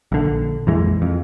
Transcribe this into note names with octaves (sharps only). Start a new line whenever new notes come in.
A#1 D3
A#1 F2 E3 G#3
F2